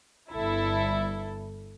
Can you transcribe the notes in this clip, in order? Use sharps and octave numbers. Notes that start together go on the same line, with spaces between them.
G1 E4 A4